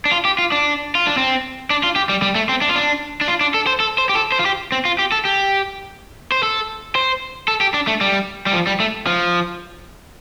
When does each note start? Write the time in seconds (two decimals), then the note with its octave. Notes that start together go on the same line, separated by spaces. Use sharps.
0.05 D4
0.12 F4
0.25 G4
0.39 F4
0.52 D4
0.95 F4
1.07 D4
1.18 C4
1.70 D4
1.84 F4
1.96 G4
2.09 G3
2.22 G3
2.35 A3
2.49 C4
2.62 D4
2.69 F4
2.76 D4
3.21 D4
3.28 F4
3.41 D4
3.54 A4
3.67 C5
3.80 A4
3.98 C5
4.09 G4
4.15 A4
4.32 C5
4.39 F4
4.46 G4
4.72 C4
4.85 F4
4.99 G4
5.12 A4
5.25 G4
6.32 C5
6.43 A4
6.95 C5
7.48 A4
7.61 G4
7.74 D4
7.87 A3
8.01 G3
8.46 G3
8.53 F3
8.67 G3
8.80 A3
9.07 F3